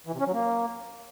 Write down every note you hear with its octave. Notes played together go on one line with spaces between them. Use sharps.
E3
C3
C#4
F#3
A#3